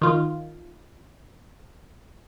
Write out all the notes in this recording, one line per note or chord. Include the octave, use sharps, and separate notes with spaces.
D#3 F4